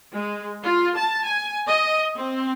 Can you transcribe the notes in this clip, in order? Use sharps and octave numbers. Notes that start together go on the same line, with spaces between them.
G#3
F4
A5
G#5
D#5
C4